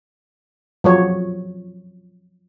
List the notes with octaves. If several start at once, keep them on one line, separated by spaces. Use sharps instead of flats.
F3 F#3 C#5